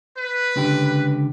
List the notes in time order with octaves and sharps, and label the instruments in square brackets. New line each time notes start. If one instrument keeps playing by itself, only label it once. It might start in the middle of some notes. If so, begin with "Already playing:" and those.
[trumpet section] B4
[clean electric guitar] C#2 D3 G4